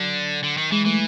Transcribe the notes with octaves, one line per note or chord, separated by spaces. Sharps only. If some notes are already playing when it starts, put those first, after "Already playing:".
Already playing: D3 F#3
D3
D#3
E3 G#3
E3 A3